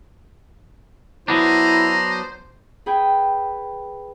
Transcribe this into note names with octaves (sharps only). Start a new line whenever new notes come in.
F#3 B3 D4 E4 C5 A#5
G#4 B4 G5 G#5